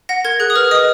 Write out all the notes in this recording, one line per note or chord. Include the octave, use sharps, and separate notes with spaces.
F#5 A#6
A#4 G#6
G#4 F#6
D#6
B4 F6
D#5 D#6